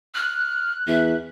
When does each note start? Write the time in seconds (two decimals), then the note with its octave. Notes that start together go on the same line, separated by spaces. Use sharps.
0.15 F6 F#6
0.88 E2 E5